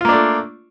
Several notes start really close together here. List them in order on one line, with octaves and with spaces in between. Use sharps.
F4 A#3 D4 A3